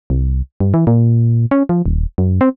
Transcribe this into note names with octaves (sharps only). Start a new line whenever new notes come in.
C2
G2
E3
A#2
C#4
F3
D#1
F#2
C4